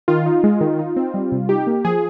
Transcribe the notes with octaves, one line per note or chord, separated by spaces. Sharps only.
D#3 F4
D#4
G#3
D#3
D#4
C4
G3
C3
D#4 G4
A#3
F3 G#4